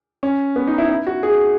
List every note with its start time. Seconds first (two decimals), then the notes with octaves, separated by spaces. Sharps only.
0.23 C#4
0.56 B3
0.67 D#4
0.78 E4
0.89 E4
1.07 F#4
1.23 G#4